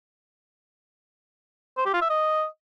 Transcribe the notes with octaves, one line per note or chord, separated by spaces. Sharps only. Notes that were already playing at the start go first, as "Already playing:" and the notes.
C5
G4
F4
E5
D#5